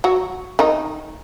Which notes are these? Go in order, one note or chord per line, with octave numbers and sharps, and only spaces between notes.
F#3 F#4
D#3 D#4